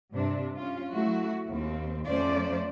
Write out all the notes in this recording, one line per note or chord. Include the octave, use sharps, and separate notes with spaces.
G2 C3 D4
C#4 F4
F#3 A3 E4 F#4
D#2 C4
F2 A3 C#4 C5 D5